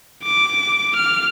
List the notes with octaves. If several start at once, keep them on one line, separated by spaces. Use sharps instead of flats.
D6
F6